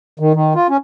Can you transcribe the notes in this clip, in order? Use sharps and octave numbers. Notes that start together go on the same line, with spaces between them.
D#3
D#3
F4
C#4